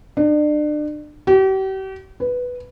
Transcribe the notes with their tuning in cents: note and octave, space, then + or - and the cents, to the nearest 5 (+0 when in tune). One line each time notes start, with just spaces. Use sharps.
D4 +35
G4 -40
B4 +0